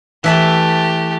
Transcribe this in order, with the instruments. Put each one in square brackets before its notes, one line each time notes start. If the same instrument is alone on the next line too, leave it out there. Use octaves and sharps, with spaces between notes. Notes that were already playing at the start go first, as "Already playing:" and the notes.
[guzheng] E3 E5 A5 [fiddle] A3 G4